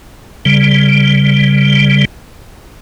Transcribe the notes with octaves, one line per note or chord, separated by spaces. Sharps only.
C#3 G3